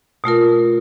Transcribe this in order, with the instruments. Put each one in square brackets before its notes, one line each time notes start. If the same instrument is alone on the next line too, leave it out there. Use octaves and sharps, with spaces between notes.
[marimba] B2 A3 F4 A#4